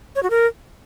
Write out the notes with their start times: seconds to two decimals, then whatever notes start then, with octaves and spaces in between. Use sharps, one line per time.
0.15 C#5
0.23 F#4
0.30 A#4